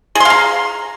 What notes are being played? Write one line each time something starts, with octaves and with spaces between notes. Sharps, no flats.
G#4 F5 A#5 C6